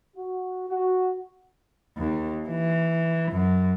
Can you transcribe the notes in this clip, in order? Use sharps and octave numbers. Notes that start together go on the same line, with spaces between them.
F#4
F#4
D#2
E3
F#2